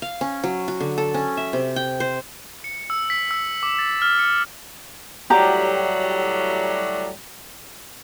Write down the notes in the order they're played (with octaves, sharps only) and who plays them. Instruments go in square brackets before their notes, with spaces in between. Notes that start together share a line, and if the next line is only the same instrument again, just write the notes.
[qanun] F5
C#4
F#3
F#4
D3
A4
C#4
E5
C3
G5
C5
[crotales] C#7
E6
B6
E6
D6
A6
F6
C#7
[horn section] A2 F#3 G3 [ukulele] F#4 G4 A#5